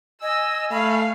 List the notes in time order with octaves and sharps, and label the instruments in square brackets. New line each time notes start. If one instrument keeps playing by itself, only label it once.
[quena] D#5 [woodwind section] G#5 [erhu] E6
[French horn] A3 [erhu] F5 [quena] B5